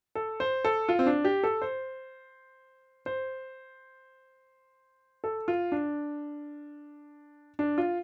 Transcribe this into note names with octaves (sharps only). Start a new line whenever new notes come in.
A4
C5
A4
F4
C4
D4
G4
A4
C5
C5
A4
F4
D4
D4
F4